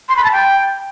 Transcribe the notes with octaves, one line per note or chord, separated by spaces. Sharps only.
C6
B5
A5
G5